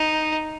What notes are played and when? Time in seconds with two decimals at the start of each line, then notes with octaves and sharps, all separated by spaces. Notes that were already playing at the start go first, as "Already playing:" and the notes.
Already playing: D#4